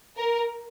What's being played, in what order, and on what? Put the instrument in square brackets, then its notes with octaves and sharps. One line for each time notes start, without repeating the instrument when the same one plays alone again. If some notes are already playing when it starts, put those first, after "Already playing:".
[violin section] A#4